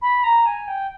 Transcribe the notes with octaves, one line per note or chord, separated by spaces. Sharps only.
B5
A#5
G#5
G5